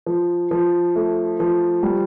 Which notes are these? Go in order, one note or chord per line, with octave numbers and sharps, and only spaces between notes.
F3
F3
A3
F3
G3